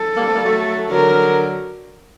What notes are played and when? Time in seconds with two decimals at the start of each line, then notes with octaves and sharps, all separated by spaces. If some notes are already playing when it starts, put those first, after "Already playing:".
Already playing: A4
0.17 G3 A#3
0.26 A3 C4
0.35 G3 A#3
0.44 F#3 A3
0.91 D3 F#3 A#4